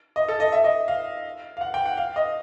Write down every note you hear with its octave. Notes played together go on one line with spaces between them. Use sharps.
D#5
A4
D#5
E5
D#5
F5
F5
F#5
G5
F#5
F5
D#5